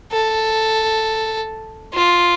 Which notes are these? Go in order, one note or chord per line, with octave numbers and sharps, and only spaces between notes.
A4
F4